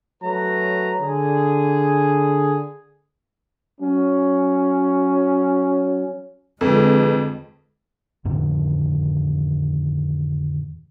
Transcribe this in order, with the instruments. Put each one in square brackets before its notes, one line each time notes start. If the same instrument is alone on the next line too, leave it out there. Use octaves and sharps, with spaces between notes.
[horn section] F#3 A3 B4 A#5
D3 G#4
[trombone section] F#3 C#4
[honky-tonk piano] F2 [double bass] D3 G#3 [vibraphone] F4 G#4 B4
[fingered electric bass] F2 A2 D3 D#3